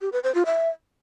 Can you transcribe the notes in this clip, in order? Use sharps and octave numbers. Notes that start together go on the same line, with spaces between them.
G4
B4
C5
F4
E5